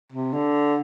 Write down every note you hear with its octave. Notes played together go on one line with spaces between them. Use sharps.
C3
D3